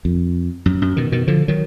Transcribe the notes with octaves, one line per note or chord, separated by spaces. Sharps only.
F2
F#2
F#2
B2 D#3
B2 D#3
D3 F3
D#3 F#3